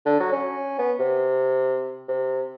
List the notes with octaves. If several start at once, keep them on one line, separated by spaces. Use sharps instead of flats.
D3
F#3
C#4
B3
C3
C3